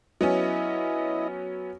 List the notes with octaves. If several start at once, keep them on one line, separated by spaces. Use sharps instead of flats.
F#3 B3 C#4 E4 D#5